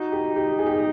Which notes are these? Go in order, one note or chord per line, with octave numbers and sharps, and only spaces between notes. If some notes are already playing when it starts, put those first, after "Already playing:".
Already playing: D#4 F#4
G4
G4
G#4
G4
G#4